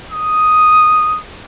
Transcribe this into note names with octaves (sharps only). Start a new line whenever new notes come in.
D#6